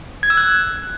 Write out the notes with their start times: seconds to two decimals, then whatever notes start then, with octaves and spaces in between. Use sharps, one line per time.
0.23 G#6
0.30 E6
0.37 F#6